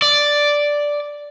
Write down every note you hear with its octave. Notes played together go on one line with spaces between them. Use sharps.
D5